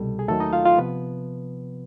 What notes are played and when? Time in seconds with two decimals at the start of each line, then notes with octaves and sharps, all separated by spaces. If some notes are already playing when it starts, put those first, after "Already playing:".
Already playing: C2 B2 G3 A4
0.19 G#4
0.28 D#2 D#3 F#3 A3 A4
0.40 D#4 D#5
0.53 F4 F5
0.65 F4 F5
0.78 C3 F3 B3 B4